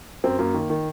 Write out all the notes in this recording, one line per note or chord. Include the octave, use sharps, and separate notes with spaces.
F#2 C4
F#2 A#3
D#3
D#3